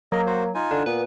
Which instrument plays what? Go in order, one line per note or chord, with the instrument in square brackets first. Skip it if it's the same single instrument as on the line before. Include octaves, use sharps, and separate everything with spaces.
[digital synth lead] F#3 [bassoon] A#3 [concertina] A#4 D#5
[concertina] F#4 C5
D#4 F4 G#5
[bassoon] D3 [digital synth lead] D4
[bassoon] A#2 [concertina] B3 [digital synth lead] B4